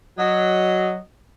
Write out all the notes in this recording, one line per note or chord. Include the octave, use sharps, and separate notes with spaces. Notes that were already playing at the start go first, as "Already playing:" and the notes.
F#3 D#5